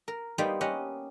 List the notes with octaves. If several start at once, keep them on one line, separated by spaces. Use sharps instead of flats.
A#4
G3 A#3 B3 D#4 C5 G5
C#4 G4 D#5 F#5